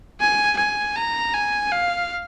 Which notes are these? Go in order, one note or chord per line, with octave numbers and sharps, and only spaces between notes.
G#5
G#5
A#5
G#5
F5